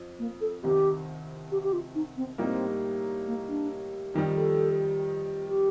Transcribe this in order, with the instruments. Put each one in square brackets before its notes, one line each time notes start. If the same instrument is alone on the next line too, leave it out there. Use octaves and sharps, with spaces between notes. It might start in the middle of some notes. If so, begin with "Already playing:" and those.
Already playing: [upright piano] F2
[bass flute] A#3
A4
[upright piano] C2 C3 D#3 [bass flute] G4
[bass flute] G4
G4
F4
D#4
C4
[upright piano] A2 G3 A#3 D#4 [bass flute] C4
[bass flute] A#3
D4
[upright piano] F2 D#3 G3 [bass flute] D#4
[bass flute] A4
G4